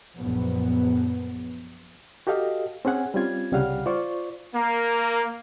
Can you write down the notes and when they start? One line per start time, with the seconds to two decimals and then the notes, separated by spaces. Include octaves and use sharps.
0.18 A#1 F#2 B3
2.27 F#4 G4 A4 D#5 F5
2.85 C4 C#4 G#4 F#5 G#5
3.14 G3 C4 C#4 F4 G#6
3.52 C2 C#3 G3 F5 F#5 F6
3.86 F4 C5 D5 C#6
4.55 A#3